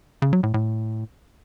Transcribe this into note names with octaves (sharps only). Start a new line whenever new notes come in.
C#3
F#3
A2
A2